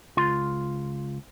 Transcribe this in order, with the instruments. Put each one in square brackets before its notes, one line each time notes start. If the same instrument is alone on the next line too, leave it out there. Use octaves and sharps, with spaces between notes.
[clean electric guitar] C#2 F4 C6